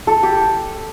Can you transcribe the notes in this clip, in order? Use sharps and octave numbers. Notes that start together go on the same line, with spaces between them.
A4
G4